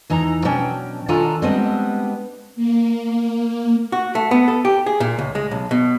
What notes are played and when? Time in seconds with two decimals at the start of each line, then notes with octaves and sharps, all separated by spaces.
0.10 E2 E3 D#4 A#5
0.45 B2 F#3 C#4 D4 G5
1.08 D#3 D4 F4 A4 G#5 A#5
1.42 G3 G#3 B3 C4 D4 D#5
2.56 A#3
3.92 F#4
4.15 A3
4.31 B3
4.48 A4
4.65 G4
4.86 G#4
5.00 A#2
5.19 C#2
5.35 G#3
5.51 B1
5.71 B2